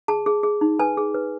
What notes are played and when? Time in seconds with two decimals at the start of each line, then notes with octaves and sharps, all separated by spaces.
0.08 G#4 A5
0.26 G#4
0.43 G#4
0.61 D#4
0.79 B4 G#5
0.97 G#4
1.14 B4